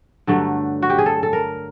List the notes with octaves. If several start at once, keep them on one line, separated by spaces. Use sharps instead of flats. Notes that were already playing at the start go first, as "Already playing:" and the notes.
G2 D3 F#3 A3
F#4
G4
G#4
A4
A4
A#4